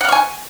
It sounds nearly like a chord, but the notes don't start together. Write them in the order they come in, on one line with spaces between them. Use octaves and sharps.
F#5 F5 C#6 G#5